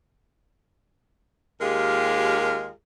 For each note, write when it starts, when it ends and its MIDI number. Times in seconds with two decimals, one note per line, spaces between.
1.61 2.70 39
1.61 2.70 56
1.61 2.70 65
1.61 2.70 67
1.61 2.70 68
1.61 2.70 70